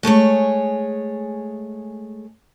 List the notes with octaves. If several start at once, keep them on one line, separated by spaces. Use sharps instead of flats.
G#3 A3 G#4 C#5